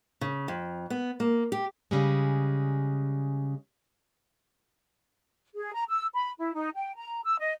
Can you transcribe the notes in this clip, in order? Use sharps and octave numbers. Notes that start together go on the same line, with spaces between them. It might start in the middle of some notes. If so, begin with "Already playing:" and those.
C#3
F2
B3
A#3
G4
C#3 G3 G#3
G#4
A#5
E6
B5
E4
D#4
G5
A#5
E6
D#5